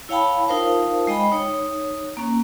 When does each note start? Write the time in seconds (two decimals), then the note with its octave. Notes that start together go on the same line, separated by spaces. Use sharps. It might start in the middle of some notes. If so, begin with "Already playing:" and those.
0.09 E4 C#5 F5 G5 A5 B5
0.47 D#4 F4 A#4 C5 F5 A5
1.07 G#3 D#5 G5 B5
1.32 D#4 C#5
2.17 A#3 C#4